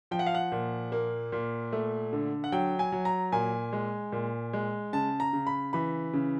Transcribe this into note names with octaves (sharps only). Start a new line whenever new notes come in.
F3 G5
F#5
F5
F#5
A#2
A#3
A#2
A3
D3
F#5
F#3 G5
G#5
F#3
A#5
A#2 G#5
G#3
A#2
G#3
C#3 A5
A#5
C#3
B5
E3 B5
C#3